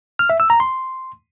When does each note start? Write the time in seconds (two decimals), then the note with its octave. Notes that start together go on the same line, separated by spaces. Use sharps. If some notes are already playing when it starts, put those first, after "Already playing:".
0.19 F6
0.29 E5
0.40 E6
0.50 A#5
0.60 C6